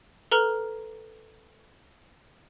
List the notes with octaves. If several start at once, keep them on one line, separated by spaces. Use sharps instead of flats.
A4 B4 A#5 F6